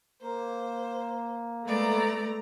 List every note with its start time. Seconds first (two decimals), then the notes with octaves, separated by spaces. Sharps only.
0.22 A#3 C5
1.66 G#3 A3 B3 D5 A#5